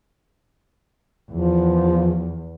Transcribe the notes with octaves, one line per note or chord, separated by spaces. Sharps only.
E2 F3